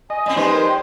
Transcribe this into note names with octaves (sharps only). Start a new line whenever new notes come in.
D#5 G#5
A2 C4
F3 G3 G#3 D#4 B4 C5 D#5
A#4
G5